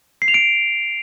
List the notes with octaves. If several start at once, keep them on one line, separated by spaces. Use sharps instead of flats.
C7
F7
D7